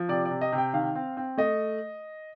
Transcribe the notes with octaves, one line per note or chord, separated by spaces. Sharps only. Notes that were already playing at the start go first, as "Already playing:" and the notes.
Already playing: F3
C3 D5
D5
C3
D#5
C3
G5
D#3 F5
C4
C4
A3 D#5